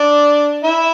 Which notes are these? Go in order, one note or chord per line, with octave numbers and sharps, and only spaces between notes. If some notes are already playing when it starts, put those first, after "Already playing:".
Already playing: D4 D5
E4 E5